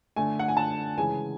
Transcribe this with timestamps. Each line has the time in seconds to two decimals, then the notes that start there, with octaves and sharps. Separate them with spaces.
0.16 D3 A3 G#5
0.39 F#5
0.48 G#5
0.57 A5
0.98 C#3 E3 G#3 G#5